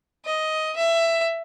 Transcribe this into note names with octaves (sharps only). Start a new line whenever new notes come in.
D#5
E5